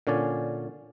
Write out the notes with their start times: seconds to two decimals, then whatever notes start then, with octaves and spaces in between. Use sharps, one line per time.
0.07 A#2 D3 C#4 D5 G#5